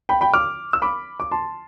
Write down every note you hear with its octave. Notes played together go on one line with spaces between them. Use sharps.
G5 B5
G5 B5
D6 F6
E6
B5 D6
D6
A5 C6